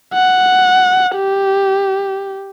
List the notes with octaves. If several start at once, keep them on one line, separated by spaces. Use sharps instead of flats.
F#5
G4